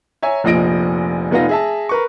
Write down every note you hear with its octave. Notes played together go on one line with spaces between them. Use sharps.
C#5 E5 G#5 A#5
F1 A#1 F3 D#5 A#6 D7
F1 B3 D#4 F4 A#6
G#4 E5 A5
A#4 B4 C#6